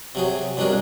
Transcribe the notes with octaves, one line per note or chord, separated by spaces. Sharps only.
C3 F#3 G#4
C2 B2 F#3 D4 G#4 A#4